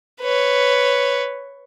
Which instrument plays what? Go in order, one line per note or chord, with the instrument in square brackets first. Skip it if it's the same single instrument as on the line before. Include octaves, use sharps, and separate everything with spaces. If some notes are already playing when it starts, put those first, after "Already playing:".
[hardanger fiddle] B4 C#5